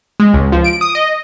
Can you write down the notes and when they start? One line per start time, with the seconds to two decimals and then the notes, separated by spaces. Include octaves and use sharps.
0.20 G#3
0.33 C#2
0.52 F3
0.64 D7
0.81 D#6
0.95 D#5